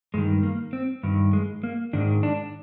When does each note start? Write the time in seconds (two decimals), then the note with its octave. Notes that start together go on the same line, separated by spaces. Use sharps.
0.14 G2 D#3 G#3
0.43 A#3
0.73 C4
1.03 G2 D#3
1.33 G#3
1.63 A#3
1.93 G#2 D#3 D4
2.23 D4